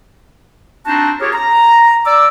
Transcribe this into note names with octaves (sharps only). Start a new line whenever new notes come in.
C4 D4 D#4 F#4 C5 A5
F4 G4 G#4 A#4 C#5
A#5
D5 D6 E6